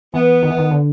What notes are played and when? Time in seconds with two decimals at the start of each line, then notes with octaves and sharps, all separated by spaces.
0.14 E3 B3
0.43 D#3
0.50 E3
0.58 D#3
0.71 D3